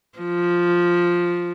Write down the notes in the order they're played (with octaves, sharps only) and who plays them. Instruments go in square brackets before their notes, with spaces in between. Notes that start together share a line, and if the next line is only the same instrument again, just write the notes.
[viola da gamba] F3